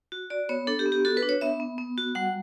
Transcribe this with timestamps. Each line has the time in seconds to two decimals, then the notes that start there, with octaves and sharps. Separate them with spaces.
0.12 F#4
0.30 F#4 D5
0.49 B3 C#5
0.67 D4 A4
0.79 G4
0.86 B3
0.92 G4
1.05 F#4 A4
1.17 B4
1.23 D4
1.29 C#5
1.41 B3 E5
1.60 B3
1.78 B3
1.98 F#4
2.15 G3 F#5